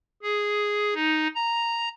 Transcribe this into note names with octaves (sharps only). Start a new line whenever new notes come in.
G#4
D#4
A#5